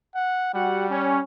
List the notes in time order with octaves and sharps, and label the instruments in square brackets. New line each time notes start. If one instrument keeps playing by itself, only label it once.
[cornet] F#5
[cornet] G3 [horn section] F#4 G4 F#5
[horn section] C#4